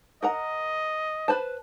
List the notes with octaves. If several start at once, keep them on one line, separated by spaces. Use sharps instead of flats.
A#4 D#5 F#5 A#5
B4 C5 A5